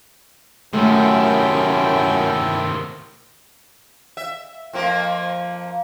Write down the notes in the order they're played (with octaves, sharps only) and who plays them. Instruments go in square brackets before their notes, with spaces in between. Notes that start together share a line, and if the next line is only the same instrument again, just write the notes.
[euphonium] F#2 [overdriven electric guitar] C3 D#3 [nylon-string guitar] A3 [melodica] E4 A4 G5
[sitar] E5
F2 F3 A#3